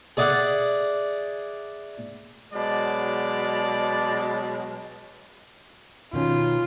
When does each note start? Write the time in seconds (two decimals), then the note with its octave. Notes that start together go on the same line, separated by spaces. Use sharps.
0.17 G#4 D5 E5 F#5
2.54 B2 F#3 G#3 D5
6.13 B2 D#3 C#4 F4